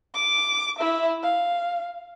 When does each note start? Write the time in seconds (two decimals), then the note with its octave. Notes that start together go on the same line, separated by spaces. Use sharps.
0.14 D6
0.79 E4 E5
1.23 F5